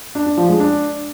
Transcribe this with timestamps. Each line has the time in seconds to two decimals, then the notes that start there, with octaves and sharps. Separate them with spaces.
0.15 D4
0.26 D4
0.38 F3
0.49 G#3
0.60 D4